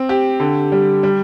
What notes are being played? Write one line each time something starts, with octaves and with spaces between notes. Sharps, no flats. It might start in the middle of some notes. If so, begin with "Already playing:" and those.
Already playing: C4
G4
D3
G3
G3